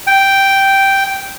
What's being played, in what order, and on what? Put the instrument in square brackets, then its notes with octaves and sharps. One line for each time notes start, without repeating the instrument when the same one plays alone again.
[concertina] G5